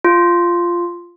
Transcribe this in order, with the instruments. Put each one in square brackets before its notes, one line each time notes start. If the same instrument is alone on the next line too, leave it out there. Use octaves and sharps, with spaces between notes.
[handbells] F4